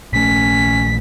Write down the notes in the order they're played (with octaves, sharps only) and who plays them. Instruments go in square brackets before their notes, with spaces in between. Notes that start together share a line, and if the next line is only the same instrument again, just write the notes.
[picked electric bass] A#1 A3 [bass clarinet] C#4 [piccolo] B6